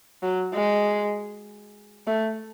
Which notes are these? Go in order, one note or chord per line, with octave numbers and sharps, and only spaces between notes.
F#3
G#3
A3